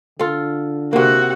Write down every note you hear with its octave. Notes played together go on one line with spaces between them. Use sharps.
D3 F4 A4
C3 A#3 F#4 F#5